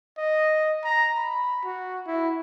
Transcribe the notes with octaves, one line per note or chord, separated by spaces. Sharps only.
D#5
A#5
B5
F#4
E4